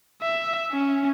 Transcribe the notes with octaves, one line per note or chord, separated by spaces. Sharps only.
E5
C#4